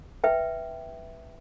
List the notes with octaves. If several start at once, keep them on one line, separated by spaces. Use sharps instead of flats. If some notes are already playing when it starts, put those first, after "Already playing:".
B4 E5 G5